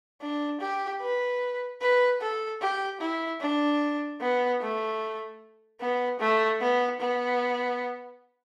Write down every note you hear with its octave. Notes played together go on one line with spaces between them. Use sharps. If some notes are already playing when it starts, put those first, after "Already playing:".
D4
G4
B4
B4
A4
G4
E4
D4
B3
A3
B3
A3
B3
B3